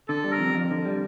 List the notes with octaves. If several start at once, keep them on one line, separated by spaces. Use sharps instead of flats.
D3 A4
G3
A#4
F2
F2
D3
G3